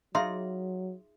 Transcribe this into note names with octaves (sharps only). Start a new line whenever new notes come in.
F#3 D#4 F4 G#4 E5 F5 C6